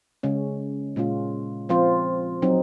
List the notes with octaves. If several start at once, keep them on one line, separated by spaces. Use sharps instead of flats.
C#3 G#3 C#4
A#2 G#3 C#4 F4
F3 C4 F4 C5
F#3 C4 D#4